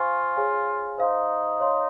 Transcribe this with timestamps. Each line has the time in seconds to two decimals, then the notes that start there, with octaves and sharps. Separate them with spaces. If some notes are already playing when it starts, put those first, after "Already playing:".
Already playing: F4 C5 F5 G#5 C#6
0.36 G#4 C#5 F5 G#5
0.98 D#4 C5 F5 C6
1.60 C#5 F5 C6